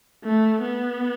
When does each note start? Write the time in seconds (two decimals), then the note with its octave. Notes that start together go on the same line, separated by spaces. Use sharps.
0.24 A3
0.62 B3